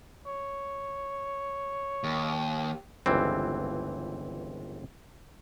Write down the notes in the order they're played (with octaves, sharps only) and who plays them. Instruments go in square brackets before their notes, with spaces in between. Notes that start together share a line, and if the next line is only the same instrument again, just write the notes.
[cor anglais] C#5
[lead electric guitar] D#2
[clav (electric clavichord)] G1 C#2 E3 C4